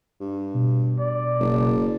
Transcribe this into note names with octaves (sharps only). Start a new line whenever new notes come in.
G2
B2
D5
F#1